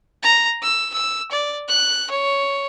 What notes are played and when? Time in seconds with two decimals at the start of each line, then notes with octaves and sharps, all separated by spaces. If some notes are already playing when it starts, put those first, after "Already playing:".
0.23 A#5
0.62 E6
0.94 E6
1.31 D5
1.68 F#6
2.10 C#5